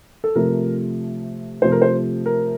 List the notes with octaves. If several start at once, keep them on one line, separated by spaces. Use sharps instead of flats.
A4
C3 F3 A3 A#4
C3 F3 A3 C5
A#4
C5
A#4